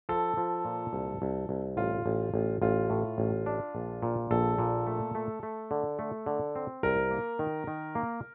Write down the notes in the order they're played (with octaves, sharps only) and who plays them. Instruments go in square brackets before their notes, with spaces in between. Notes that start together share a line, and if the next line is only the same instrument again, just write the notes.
[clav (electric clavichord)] F3 [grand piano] A4
[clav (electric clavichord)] F3
A#2
C2
C2
C2
[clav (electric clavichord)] A1 [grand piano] F4
[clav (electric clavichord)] A1
A1
[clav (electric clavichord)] A1 [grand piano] F4
[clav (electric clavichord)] A2
A1
D4
A#1
A#2
[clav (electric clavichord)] A#1 [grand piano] A4
[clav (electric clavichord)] A#2
A3
A3
A3
D3
A3
D3
C4
[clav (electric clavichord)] C2 [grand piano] A#4
[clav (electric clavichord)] A#3
D#3
D#3
A#3